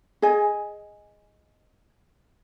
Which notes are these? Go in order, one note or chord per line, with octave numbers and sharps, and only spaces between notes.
G#4 D#5 G#5